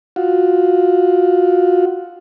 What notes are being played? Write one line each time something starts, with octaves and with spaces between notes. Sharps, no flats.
F4 F#4